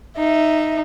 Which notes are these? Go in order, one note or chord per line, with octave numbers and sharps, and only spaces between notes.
D#4 E5